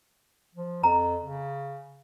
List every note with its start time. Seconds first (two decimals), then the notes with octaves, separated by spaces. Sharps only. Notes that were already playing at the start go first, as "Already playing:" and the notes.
0.55 F3
0.83 F2 A#5
1.24 C#3